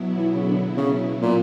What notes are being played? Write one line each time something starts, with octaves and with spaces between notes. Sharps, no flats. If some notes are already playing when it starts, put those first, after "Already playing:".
Already playing: B2 F#3 B3 E4
E3
C#3
D3
C#3
A#2